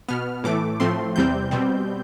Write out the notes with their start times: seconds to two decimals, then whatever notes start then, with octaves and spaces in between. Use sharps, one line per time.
0.09 B2 B3 F6
0.44 A2 E3 A3 D6
0.80 A2 F3 A3 C4 C6
1.16 E2 C3 G3 C4 G6
1.51 B2 G3 C4